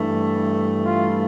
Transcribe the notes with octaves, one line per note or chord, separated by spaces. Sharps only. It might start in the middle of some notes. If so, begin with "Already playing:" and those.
Already playing: G2 E3 A3
F4